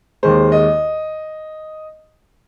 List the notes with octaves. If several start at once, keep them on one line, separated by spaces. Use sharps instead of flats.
D#2 D#3 G#3 C5
D#5